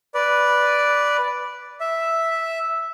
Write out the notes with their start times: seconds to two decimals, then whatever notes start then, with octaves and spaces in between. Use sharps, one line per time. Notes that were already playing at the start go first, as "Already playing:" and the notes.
0.14 B4 D5
1.80 E5